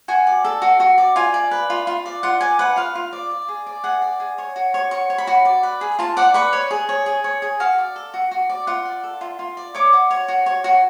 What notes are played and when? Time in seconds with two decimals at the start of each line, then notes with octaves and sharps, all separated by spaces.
0.08 F#4 G#5
0.27 D5
0.45 A4
0.62 F#4
0.80 F#4
0.98 D5
1.16 F4 G#5
1.34 D5
1.51 B4
1.70 F4
1.87 F4
2.06 D5
2.23 F4 F#5
2.41 D5 G#5
2.59 B4 F#5
2.76 F4 F5
2.95 F4
3.13 D5
3.31 D5
3.49 G#4
3.66 D5
3.84 G#4 F#5
4.02 D5
4.20 G#4
4.38 C#5
4.56 F#4
4.74 C#5
4.91 F#4 C#6
5.10 C#5
5.18 B5
5.27 F#4
5.45 D5
5.63 B4
5.81 G#4
5.99 F4 A5
6.17 D5 F#5
6.34 B4 C#6
6.53 C#5
6.71 G#4
6.89 C#5
7.06 G#4
7.24 C#5
7.42 G#4
7.60 F#4 F5
7.78 D5
7.96 A4
8.14 F#4
8.31 F#4
8.50 D5
8.67 F4 F#5
8.85 D5
9.04 A4
9.21 F4
9.39 F4
9.57 D5
9.75 C#5 D6
9.93 F#4
10.11 C#5
10.28 F#4
10.46 C#5
10.64 F#4